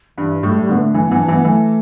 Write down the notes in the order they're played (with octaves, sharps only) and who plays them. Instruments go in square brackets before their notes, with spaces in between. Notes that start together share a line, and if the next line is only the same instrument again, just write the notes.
[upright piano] G2 [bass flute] E3
[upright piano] A2 [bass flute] G3
[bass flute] A3
G3
[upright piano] D3 [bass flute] B3
[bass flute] A3
[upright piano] E3 [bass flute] A3
[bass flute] B3
[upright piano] E3
[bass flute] D4
[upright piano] E3 [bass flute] B3
[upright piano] E3 [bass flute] A3